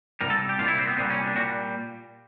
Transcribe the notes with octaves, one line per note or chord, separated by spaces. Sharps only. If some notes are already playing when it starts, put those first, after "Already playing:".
C2 A#2 G3 A#4
A4
G4
C2 A#2 G3 F4
E4
C4
B3
C2 A#2 G3 C4
C#4
D4
A#2 G3 F#4